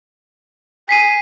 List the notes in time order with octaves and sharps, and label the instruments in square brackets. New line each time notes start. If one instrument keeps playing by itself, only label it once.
[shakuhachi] G#5 [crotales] B6 C7 D#7